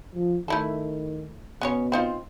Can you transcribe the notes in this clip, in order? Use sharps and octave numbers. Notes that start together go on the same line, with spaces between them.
F3
D#3 A3 E4 A4
B2 B3 C#4 C#5
C4 D#4 F4